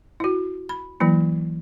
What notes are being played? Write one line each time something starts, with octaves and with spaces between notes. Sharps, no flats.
E4 F#4
B5
E3 F#3 A#3 E4